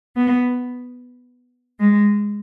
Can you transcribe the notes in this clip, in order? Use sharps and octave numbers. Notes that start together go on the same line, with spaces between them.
B3
G#3